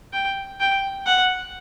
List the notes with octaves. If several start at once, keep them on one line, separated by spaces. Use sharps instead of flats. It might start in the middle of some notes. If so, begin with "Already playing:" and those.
G5
G5
F#5